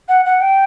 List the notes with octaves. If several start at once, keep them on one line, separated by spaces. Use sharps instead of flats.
F#5
F#5
G5